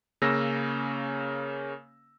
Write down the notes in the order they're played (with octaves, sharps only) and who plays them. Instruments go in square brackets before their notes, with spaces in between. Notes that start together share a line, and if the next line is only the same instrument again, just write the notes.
[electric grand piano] C#3 A#3 C#4 E6 A#6